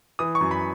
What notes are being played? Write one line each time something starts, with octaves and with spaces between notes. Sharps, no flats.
E3 D#6
C#6
F#2
B5